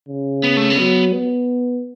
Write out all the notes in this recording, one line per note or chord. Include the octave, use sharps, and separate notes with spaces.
C#3
B3
A3
B3
F#3
B3